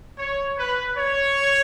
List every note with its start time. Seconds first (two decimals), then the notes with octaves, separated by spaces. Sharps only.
0.18 C#5
0.57 B4
0.97 C#5